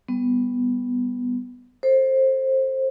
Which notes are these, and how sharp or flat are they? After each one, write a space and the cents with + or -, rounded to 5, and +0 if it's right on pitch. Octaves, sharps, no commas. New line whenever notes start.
G3 +15 B3 +0
A4 +0 C5 +20